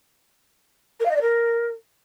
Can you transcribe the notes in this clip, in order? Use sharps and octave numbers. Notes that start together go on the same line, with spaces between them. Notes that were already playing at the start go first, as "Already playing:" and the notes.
A#4
F5
D#5
D5
A#4